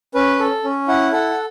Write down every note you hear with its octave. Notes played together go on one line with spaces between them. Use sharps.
C#4 B4
A4
C#4
E4 F#5
A4 F#5